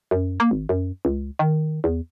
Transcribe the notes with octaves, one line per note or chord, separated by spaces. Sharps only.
F#2
A#3
G#1
F#2
C#2
D#3
E2